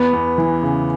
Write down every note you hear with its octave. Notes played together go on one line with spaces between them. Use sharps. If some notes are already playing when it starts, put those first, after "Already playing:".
Already playing: E2 B3
E2
E3
C#3